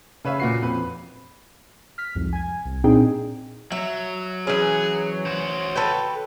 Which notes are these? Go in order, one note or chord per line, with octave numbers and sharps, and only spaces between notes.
C#3 B4 C#5 E5 F5
A#2 F#4 C7
F2 B4
F6 B6
C2 F2 G#2
G#5 G#6
C2
A#2 C4 D4 D#4 G#4 G5
F#3 E5
E3 C#4 G#4
C#5
F#4 C5
A4 B4 G5